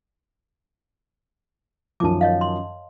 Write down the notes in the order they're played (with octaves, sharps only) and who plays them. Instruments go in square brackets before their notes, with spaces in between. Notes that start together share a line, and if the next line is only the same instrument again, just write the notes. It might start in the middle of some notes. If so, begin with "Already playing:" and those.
[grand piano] F#2 D#3 F3 [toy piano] A5 D6
[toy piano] C#5 D#5 F5
C6